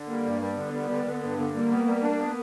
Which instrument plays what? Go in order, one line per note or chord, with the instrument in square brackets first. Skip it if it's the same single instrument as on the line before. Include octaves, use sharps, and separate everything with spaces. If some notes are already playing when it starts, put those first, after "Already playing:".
Already playing: [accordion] D3
[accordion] G3 [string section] A#3
[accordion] G2
G3
[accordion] D3 [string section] B3
[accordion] G3
D3
D3
G2
D3
[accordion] G3 [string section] A#3
[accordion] B3
G3
D4
B3